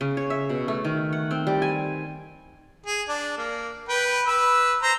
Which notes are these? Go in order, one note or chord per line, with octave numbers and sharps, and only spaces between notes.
C#3
C#5
E5
B2
A3
D#3
F#5
C4
G3
G#5
G#4
D4
A#3
B4 G5
B4 E6
C5 A#5